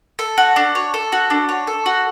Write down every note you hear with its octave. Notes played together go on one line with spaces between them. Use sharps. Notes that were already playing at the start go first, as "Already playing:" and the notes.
A4
F#4
D4
C#5
A4
F#4
D4
C#5
A4
F#4